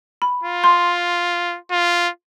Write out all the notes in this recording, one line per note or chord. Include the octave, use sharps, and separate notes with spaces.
B5
F4
C6
F4